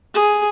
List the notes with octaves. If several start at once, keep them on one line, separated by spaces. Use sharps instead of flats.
G#4